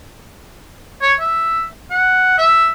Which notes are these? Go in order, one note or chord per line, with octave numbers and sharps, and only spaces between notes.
C#5
E5
F#5
E5